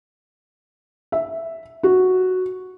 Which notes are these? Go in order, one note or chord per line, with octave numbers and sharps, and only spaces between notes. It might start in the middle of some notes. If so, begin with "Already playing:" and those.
E5
F#4